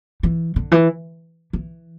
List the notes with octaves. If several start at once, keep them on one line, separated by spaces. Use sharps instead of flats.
E3
D3
E3
E3